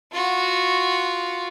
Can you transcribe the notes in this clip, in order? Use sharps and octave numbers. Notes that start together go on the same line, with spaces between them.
F4 F#4